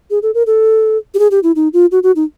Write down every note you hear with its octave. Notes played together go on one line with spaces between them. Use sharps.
G#4
A4
A#4
A4
G4
G#4
G4
E4
D#4
F4
F#4
F#4
D#4